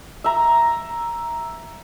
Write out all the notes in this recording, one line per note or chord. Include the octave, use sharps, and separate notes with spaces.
E5 A#5